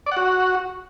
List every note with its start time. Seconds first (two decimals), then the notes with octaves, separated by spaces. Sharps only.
0.06 D5
0.12 F#5
0.17 F#4